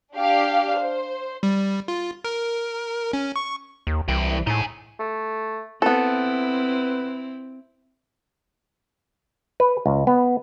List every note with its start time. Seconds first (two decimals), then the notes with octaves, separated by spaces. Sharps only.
0.14 D4 G4 F5
0.80 C5
1.43 G3
1.88 F4
2.24 A#4
3.13 C#4
3.36 C#6
3.87 D#2
4.08 C2 E3 G5
4.47 A2 D#4 G#5
4.99 A3
5.82 B3 C4 E4 A4 B4
9.60 B4
9.86 C#2
10.07 B3